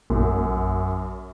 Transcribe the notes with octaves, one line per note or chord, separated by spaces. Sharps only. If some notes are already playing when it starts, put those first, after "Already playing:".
A#1 F#2